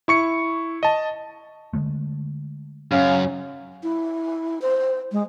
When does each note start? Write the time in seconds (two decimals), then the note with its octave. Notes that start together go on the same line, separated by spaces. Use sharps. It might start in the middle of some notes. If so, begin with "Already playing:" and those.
0.08 E4 C#6 C#7
0.83 D#5 A5
1.73 D3 G#3 A3
2.92 F#2 C#3 F5
3.83 E4
4.62 C5
5.12 G#3